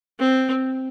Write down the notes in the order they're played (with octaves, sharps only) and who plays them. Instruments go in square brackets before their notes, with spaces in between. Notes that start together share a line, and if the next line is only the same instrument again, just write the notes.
[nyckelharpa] C4